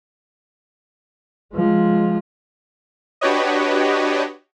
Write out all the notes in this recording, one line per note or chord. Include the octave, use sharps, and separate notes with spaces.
F3 G#3
D4 F#4 G4 B4 C#5 D#5